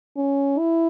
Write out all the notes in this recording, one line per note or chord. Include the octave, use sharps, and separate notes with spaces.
C#4
E4